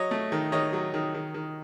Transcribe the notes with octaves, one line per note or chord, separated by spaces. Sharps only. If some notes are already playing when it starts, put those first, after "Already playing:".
Already playing: F#3 C#5 D#5
A3
D#3
D#3 C#5 D#5
F#3
D#3
D#3
D#3